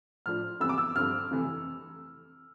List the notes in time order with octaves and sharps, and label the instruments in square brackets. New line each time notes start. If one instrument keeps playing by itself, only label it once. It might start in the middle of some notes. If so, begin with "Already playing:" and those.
[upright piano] A2 F3 A3 D4 F4 F6
F2 C3 E3 G3 B3 E6
D6
E6
G2 D3 F3 C4 F6
F2 C3 E3 A3